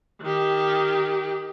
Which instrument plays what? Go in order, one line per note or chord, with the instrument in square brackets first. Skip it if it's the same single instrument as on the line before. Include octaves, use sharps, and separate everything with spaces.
[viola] D#3 G4